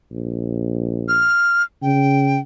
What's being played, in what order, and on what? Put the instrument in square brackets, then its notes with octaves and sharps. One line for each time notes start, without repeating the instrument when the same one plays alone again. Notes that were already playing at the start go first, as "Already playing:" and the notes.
[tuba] A#1
[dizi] F6
[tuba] C#3 [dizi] G5